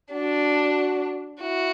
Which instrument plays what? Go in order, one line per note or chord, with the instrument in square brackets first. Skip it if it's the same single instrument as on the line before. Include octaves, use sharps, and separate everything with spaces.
[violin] D4 [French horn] F#4
[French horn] E4 [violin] F#4